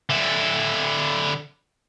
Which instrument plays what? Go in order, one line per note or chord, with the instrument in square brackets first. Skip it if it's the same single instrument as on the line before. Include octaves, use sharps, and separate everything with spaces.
[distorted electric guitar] D3 E4